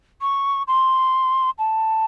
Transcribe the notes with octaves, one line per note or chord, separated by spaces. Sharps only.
C#6
C6
A5